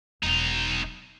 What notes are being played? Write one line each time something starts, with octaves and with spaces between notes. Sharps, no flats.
E1 B1 D#4